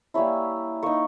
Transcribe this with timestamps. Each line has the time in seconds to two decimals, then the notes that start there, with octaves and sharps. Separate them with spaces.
0.14 G3 A#3 C#4 E4 B5
0.82 A#3 D#4 C#6